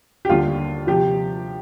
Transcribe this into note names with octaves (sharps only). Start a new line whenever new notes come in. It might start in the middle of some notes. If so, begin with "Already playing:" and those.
G4
D#2 D3 G3 F4
C3 F3 G4